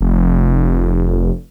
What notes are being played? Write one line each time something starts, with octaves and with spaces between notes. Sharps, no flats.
F1